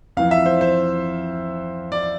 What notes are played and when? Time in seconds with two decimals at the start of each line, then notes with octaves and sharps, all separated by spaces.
0.17 F2 E3 F5
0.31 E5
0.46 C5
0.61 C5
1.92 D5